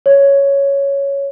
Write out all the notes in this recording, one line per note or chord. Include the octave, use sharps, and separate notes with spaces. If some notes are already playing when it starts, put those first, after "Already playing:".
C#5